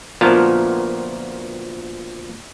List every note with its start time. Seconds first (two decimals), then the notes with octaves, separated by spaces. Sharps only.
0.21 D2 A#2 F3 B3 A#4 A5